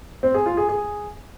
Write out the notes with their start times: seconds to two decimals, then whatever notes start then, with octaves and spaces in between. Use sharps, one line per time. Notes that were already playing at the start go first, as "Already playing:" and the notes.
0.23 C4
0.34 G#4
0.46 F4
0.57 G#4
0.69 G#4